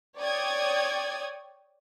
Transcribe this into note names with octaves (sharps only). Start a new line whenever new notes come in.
C#5 D5 G5 D#6 G#6